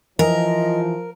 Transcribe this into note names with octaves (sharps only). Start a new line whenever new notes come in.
E3 F3 A#4 D#5